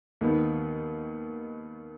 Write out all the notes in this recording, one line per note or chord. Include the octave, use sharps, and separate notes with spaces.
D#2 D#3 B3